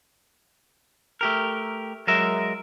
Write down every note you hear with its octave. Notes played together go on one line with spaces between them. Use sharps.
A3 G4 A#4
F#3 G#3 A#4 E5